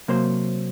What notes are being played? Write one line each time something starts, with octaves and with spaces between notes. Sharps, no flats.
C3 F#3 A#3 C5